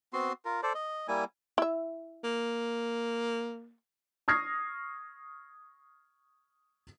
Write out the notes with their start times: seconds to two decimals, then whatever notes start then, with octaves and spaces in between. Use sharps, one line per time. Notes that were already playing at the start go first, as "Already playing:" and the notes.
0.13 B3 C4 F#4 C6
0.45 F4 A#4
0.63 A4 C5 D5
0.75 D#5
1.08 G3 A#3 E4 G#5
1.58 E4 E5
2.24 A#3
4.28 C#6 D#6 F6 G#6 A#6 C7